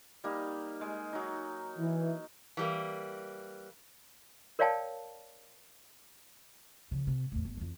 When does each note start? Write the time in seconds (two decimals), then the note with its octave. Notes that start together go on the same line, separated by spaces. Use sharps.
0.24 G3 A#3 D#4
0.81 G#3
1.13 F#3 D#4
1.79 E3
2.57 E3 G3 A#3
4.59 A#4 C#5 D5 F5 G5 A5
6.91 C#3 F3
7.07 C3
7.32 E2 A2
7.45 G1
7.57 F2 E3